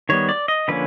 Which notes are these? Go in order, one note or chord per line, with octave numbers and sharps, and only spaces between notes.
D#3 G3 B3 C#5
D5
D#5
D3 F3 A#3 C#4 B4